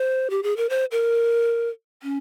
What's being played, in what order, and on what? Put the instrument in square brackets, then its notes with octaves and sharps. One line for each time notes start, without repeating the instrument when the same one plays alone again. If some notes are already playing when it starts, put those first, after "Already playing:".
Already playing: [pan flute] C5
G4
G#4
A#4
C5
A#4
C#4